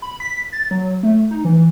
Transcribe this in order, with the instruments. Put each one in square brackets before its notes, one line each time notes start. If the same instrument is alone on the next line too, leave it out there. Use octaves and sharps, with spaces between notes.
[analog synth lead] B5
B6
A6
F#3
A3
D#4
E3